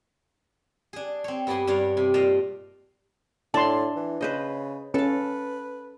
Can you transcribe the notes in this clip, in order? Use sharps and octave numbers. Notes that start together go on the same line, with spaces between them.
D4 G#4
C4 C#5
G2 B3 D5 F#5 G#5 C6
G2 D4 C#5 D5 F5
C3
A#2 D5 D#5 F5 A5
A2 D4 A5 C6
E3
C#3 B4 C5 D#5
C#4 A4 B4 F5